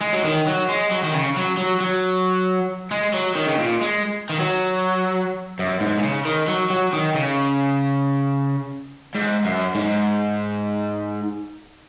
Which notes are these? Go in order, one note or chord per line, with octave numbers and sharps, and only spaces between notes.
G#3
F#3
D#3
F#3
G#3
F#3
D#3
C#3
F#3
F#3
F#3
G#3
F#3
D#3
C#3
A#2
G#3
D#3
F#3
F#2
G#2
A#2
C#3
D#3
F#3
F#3
D#3
C#3
G#2
F#2
G#2